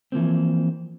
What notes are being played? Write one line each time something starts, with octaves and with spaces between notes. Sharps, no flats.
E3 F3 A#3 C4